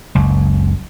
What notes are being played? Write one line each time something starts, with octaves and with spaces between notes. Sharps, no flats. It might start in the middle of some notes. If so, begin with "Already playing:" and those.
F#1 C#2